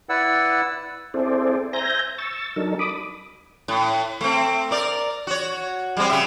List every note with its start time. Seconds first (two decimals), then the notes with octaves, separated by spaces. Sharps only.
0.09 E4 B4 D5 F#5 E6
1.14 C4 E4 G#4 A4 C5 D5
1.73 C5 E5 G#5 A#5 G6 A#6
2.18 C#6 E6 A6
2.56 F#3 D4 D#4 A4 A#4
2.79 B5 D6 D#6
3.68 A2
4.21 A3 C4
4.71 A#4 D5
5.27 F#4 C#5
5.97 G3 G#3 C4
6.10 C#3 E5